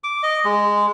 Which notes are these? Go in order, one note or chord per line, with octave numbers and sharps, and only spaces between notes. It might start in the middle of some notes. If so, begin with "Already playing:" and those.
D6
D#5
G#3